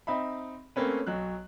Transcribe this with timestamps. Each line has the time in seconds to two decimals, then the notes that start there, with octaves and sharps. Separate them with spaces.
0.07 C4 D#4 E5 B5
0.76 A3 A#3 C4 C#4 B4
1.07 B1 F#3 F#6